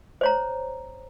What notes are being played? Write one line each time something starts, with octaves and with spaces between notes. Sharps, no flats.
C5 C#5 A#5